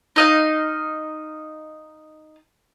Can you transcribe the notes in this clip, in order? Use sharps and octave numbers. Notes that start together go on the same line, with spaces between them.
D#4 D#5 F5